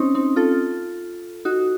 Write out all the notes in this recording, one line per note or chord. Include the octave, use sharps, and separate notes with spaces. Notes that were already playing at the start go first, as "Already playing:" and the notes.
Already playing: C4 C#4 D#4
C4 D#4
F4 A4
D#4 F#4